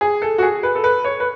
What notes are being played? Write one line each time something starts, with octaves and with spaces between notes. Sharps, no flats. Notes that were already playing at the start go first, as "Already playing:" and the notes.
G#4
A4
F#4
G#4
B4
A4
B4
C#5
B4